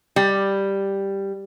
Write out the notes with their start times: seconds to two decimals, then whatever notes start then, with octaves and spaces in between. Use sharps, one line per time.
0.16 G3